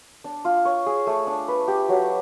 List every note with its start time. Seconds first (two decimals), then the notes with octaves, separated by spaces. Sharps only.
0.24 D4
0.45 F4
0.65 C#5
0.86 G#4
1.07 A3
1.27 D4
1.48 B4
1.68 G4
1.89 F#3